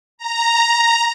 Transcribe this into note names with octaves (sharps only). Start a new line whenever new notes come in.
A#5